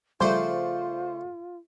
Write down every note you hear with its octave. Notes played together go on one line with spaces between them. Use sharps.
C#3 F3 G3 A3 D4 F4 C5 D5